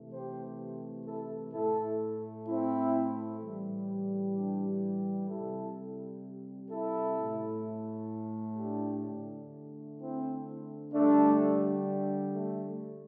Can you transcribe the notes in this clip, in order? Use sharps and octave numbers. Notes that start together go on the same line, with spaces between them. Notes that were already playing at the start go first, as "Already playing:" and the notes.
Already playing: C3 E3 A3
G4 C5
E4 A4
A2 A3 E4 A4
C4 E4
A2 E3 G3
D4 G4
C3 G3 E4 A4
E4 A4
A3
A2
D4 G4
D3 A3
C4 E4
D3 G3 A3 D4
A3